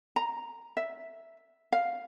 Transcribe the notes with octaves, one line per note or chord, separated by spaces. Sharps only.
A#5
E5
F5